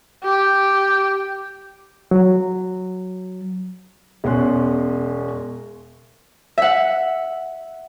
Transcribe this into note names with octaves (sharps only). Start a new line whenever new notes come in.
G4
F#3
E1 B2 C#4 C6 F#6
E5 F#5